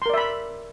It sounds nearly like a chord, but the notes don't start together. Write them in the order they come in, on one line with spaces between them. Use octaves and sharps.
C6 A#4 D5 E5 B5